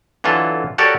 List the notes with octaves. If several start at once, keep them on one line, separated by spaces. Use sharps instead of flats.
D3 E3 F#3 F4 A4
F#4 G4 A4 A#4 C#5 D5